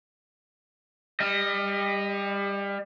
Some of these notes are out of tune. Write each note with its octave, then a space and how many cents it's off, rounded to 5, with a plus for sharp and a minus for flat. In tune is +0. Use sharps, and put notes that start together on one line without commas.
G3 +25 D#5 +0